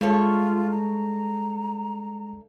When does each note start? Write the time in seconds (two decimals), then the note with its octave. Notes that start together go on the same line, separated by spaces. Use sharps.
0.01 G2 G#3 A3 F4 C#5
0.71 A#5